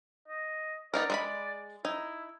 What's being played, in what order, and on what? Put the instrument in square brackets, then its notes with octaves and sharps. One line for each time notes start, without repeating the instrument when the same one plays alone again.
[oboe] D#5
[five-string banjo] B3 D#4 A#4 [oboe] D5
[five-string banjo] G#3 B4 B5
[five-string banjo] D#4 [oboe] E4